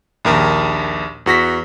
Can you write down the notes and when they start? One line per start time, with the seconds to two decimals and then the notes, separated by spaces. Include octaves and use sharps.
0.25 A#1 D#2 A#4
1.26 E2 F#4 A#6 B6